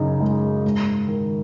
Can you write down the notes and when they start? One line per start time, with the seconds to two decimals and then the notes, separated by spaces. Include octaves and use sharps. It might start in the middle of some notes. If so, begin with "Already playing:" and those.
Already playing: F#2 C#3 D#4
0.20 G#3
0.64 G#2
1.07 D#3